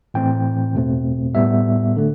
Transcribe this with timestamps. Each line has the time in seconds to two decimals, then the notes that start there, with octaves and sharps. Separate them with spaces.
0.14 A2 E3 A3 C4 G5
0.75 E2 B2 A3 C4
1.34 A2 G3 B3 E5
1.96 D3 A3